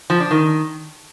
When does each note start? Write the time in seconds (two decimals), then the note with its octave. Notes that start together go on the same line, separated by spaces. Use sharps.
0.10 F3
0.20 D4
0.31 D#3